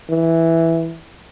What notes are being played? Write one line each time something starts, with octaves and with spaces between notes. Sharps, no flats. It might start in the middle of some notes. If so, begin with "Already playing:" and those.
E3